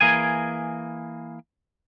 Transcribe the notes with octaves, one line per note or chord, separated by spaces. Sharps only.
E3 A#3 G#4 G#5